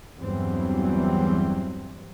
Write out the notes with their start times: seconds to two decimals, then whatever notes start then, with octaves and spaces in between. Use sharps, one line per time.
0.19 E2 G2 E3 F#3 G3 C4